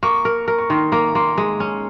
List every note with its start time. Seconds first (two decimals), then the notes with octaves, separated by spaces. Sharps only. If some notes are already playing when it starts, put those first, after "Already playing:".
0.03 A#3 C#6
0.25 A#4
0.48 A#4
0.58 C#6
0.70 D#3 C6
0.92 A#3 A#5
1.15 A#3 C6
1.38 G#3
1.60 C#4